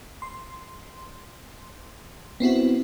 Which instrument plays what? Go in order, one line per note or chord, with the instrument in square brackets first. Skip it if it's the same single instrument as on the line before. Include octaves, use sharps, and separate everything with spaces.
[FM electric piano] C6
B3 C4 E4 F#4